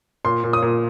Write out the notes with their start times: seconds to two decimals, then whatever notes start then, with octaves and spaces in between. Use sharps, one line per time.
0.25 A#2 C6
0.44 A#2
0.53 D#6
0.62 A#2